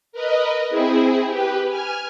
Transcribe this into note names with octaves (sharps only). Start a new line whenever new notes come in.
A#4 B4 D#5
C4 E4 G#4
G4 B4
G#5 F6